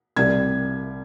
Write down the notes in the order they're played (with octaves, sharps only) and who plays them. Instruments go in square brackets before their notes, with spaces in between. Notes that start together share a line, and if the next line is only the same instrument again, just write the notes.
[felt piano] C2 C3 G3 G#6